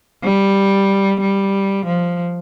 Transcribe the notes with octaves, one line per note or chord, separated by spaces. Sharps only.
G3
G3
F3